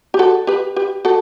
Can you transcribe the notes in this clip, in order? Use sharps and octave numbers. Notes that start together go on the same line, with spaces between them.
G4
F#4 A4
G4 B4
G4 B4
F#4 A4